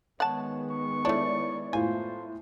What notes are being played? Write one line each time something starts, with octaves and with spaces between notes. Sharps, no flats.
D#3 G#3 B3 C#5 F#5 A5
C#6
A3 D4 E4 C#5 D5
A2 E4 F4 C5 G#5